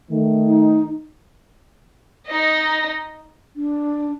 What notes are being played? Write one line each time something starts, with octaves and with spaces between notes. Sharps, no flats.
D#3 A3
D#4
D#4 D#5
D4